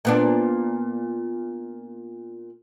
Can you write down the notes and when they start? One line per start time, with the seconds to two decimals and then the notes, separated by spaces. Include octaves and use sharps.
0.05 A#2 B3 D4